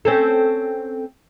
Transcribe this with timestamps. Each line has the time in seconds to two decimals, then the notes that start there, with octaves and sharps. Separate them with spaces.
0.05 C4 C#4 A4